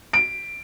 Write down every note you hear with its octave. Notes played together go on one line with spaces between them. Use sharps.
D7